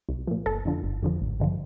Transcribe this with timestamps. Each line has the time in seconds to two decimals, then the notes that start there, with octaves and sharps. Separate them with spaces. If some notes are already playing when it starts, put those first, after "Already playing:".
0.09 C2
0.27 A#2 F3
0.46 G1 A4
0.65 F2 D3 F3
0.83 G1
1.03 F2 D3 F3
1.21 A1
1.40 G2 D3 F3